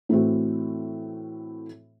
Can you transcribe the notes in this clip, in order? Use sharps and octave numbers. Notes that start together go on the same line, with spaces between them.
A2 E3 A3 C4 F#4